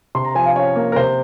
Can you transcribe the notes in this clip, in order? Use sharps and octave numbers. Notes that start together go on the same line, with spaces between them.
C3 C6
A#5
F3 G#5
F5
C#4 C#5
A#3
A#4
C3 C5